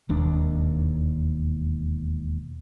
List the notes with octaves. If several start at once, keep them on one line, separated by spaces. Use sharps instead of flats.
E1 D#2 D4